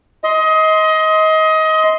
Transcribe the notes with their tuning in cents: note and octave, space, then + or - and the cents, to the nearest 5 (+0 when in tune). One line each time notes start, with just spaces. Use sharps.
D#5 +25 C6 -5